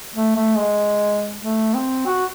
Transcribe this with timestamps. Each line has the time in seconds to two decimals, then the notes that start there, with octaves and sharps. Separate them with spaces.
0.15 A3
0.36 A3
0.58 G#3
1.43 A3
1.74 C4
2.07 F#4